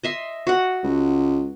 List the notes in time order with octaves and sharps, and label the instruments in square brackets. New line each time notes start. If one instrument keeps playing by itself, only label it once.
[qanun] D#5 E5 C6
F#4 F#5
[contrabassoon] C#2